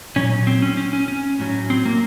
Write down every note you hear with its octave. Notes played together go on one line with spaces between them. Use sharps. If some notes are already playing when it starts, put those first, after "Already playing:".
A#2 F#3 C#4
C4
C#4
C#4
C#4
C#4
A2 F#3
C4
A#3